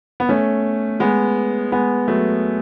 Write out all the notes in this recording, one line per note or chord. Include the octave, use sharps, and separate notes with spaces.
B3
A3 C#4
G#3 B3
G#3 B3
F#3 A3